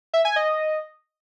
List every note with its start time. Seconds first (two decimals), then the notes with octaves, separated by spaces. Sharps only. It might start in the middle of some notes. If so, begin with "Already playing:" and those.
0.14 E5
0.25 G#5
0.36 D#5